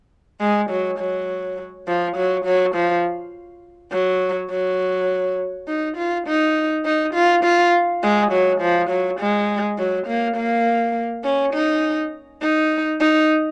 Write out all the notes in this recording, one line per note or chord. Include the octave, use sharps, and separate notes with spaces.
G#3
F#3
F#3
F3
F#3
F#3
F3
F#3
F#3
D#4
F4
D#4
D#4
F4
F4
G#3
F#3
F3
F#3
G#3
F#3
A#3
A#3
C#4
D#4
D#4
D#4